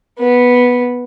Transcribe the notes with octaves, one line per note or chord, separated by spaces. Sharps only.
B3